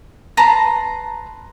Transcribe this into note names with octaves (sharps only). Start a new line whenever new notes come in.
B4 A5 A#5 C6